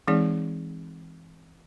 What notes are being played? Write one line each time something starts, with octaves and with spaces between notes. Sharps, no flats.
E3 G#3 C4 D#4 G#4 D5